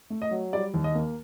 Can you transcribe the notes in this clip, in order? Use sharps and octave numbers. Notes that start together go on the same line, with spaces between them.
A3
D#5
F#3
G3 D5
D#2
D#5
A#3